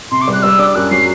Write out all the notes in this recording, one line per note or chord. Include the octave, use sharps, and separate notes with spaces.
C3 C6
D6
G3 F#6
G3 E6
D4 D6
F#2 F#6
F#3 C7